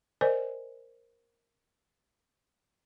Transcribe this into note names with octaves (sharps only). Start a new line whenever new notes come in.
A#4 C5 D5 D#5 G#5